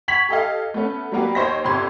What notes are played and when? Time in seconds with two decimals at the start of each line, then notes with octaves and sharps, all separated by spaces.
0.08 F#5 C#6 G#6 B6 F7 F#7
0.29 G4 A4 D#5 F5
0.74 A3 B3 C#4
1.12 F#3 G3 A#3 B3 G4
1.35 D#2 C5 C#5 D#5 A#6
1.64 G1 C3 C6 G#6